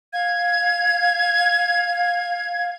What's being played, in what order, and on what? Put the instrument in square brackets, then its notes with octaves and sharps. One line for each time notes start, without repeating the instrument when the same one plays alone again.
[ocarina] F5 [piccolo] G#6